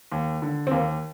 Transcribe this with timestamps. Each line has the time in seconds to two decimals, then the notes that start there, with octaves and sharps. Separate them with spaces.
0.12 D#2
0.42 D3
0.67 C4
0.71 D#2 A#3